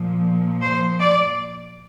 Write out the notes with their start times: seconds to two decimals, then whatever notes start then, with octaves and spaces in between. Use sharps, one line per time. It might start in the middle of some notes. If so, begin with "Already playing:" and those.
Already playing: A#2 F3
0.63 C5
1.01 D5